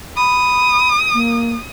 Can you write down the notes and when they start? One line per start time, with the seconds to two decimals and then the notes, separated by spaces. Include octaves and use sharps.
0.17 B5 D#6
1.14 A#3